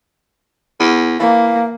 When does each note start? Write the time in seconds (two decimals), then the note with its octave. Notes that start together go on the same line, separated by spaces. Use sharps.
0.80 E2
1.20 E3 A#3 F5